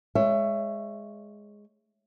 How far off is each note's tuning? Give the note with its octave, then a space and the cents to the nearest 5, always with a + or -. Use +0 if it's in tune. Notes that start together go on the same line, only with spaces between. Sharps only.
G#3 +0 C#5 +0 E5 +25